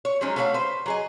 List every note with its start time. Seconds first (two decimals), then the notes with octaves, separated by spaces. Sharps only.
0.05 C#5
0.21 F3 F#3 G#3 C#4 D#4
0.36 A3 F#4 A#4 B4 C#5 F5
0.54 B4 C5
0.86 F#3 G#4 D#5